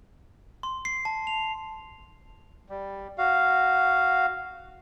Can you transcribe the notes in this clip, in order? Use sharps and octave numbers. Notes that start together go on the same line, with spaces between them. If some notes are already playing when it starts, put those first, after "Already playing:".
C6
C7
A5
F7
G3
F#4 F5